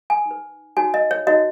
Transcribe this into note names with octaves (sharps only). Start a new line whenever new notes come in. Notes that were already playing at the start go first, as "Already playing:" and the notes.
G#5
D#4 B4
D#4 F#4 C#5 G#5
D#5
C#5
D#4 F#4 C#5 D#5